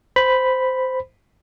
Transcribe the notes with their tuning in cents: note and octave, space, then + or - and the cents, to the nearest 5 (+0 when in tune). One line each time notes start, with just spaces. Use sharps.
C5 -15 B5 +0